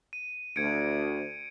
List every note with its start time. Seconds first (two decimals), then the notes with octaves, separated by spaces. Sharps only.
0.13 D#7
0.56 D2 G#6 C#7 D7